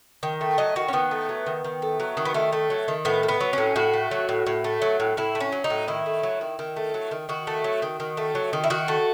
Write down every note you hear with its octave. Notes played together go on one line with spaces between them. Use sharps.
D#3
A3
F#3 D#5
D#3 F#4
C#4
D#3 B3
A3
F#3
D#3
D#3
A3
F#3
D#3
B3
D#3 A3
A3
F#3
D#3
A2 B3
A3
B3
F#3
A2 C#4
A2 F#4
A3
F#3
A2
A2
A3
F#3
A2
A2 E4
A3
C#4
F#3
D#4
A2
D#3 E4
A3
F#3
D#3
D#3
A3
F#3
D#3
D#3 F#4
A3
F#3
D#3
D#3
A3
F#3
D#3
E4
D#3 F#4
A3